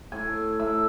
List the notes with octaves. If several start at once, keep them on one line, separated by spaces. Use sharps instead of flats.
A2 G#5
A2 E5